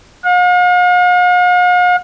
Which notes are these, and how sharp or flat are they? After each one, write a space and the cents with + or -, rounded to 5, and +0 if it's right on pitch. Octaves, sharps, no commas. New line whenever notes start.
F5 +45